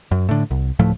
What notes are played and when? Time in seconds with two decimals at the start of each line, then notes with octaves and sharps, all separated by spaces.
0.11 F#2
0.29 A2 D3
0.51 C2
0.79 D1 A2 F3 A3